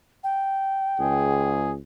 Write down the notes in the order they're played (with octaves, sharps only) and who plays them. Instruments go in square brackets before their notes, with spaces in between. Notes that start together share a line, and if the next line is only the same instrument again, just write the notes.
[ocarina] G5
[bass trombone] C#2 [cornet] G#4